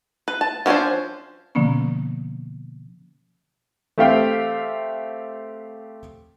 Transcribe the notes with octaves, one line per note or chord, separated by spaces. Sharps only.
B4
A5
F3 G3 C#4 D4 C5
B2 D3 F3 A#3 B3 C#4
A3 C4 G4 E5 F5 G5